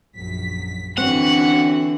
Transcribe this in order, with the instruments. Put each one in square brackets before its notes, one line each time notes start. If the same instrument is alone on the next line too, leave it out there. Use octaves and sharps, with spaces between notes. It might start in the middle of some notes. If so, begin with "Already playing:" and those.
[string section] A#1 F#2 B6
[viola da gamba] D3 E3 [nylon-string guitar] C4 [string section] C#4 F#4 [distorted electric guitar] F#5